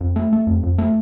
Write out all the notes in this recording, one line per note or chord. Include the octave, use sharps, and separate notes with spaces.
F2
A3
A3
F2
F2
A3